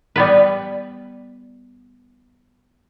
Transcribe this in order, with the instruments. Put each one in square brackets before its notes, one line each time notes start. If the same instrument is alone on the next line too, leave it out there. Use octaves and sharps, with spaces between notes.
[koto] G3 B3 B4